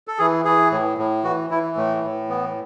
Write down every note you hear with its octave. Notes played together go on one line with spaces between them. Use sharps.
A4
E3 G#4
E3 G#4
A2
A2
E3 F#4
E3 E4
A2 A3
A2
E3 B3